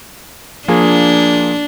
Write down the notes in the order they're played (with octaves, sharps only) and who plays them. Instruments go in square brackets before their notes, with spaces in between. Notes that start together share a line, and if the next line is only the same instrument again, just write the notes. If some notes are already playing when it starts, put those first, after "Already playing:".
[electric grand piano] F3 A#3 G#4 [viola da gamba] D4